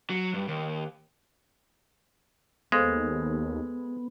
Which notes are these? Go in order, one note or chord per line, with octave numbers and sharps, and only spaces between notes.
F#3
G2
D#2
D#2 G#3 B3 A4 C5 F5